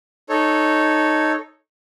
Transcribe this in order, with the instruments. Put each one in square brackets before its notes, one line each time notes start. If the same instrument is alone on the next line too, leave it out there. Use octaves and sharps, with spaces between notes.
[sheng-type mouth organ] D#4 A4 C#5